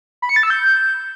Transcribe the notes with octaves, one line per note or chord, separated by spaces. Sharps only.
B5
C#7
A6
E6
G6